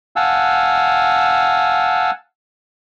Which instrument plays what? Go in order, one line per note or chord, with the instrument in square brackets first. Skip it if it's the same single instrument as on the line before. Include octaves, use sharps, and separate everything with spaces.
[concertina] F5 F#5 G#5 A5 E6